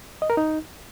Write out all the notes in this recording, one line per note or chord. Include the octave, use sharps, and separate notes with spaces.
D#5
A#4
D#4